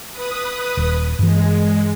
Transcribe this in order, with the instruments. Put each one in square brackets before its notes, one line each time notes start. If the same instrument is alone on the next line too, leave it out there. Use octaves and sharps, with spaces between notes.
[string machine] B4 D#6
[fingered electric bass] D#1
[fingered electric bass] G2 E3 [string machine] G#3